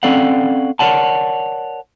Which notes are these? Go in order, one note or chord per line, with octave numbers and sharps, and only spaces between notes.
C4 C#4 A4 D5 F5 F#5
A#4 C#5 D5 F#5 A5